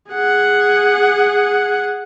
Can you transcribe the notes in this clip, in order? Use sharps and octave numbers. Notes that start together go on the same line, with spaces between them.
G#4 F#5